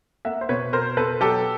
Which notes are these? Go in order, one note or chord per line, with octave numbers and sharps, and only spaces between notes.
A#3 E5 F#5
C5
B2 B4 C#5
B2 A#4 C5
B2 A4 B4
F#3 G4 A4